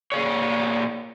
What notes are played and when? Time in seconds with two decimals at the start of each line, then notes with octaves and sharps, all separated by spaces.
0.12 A#2 G#4 C#5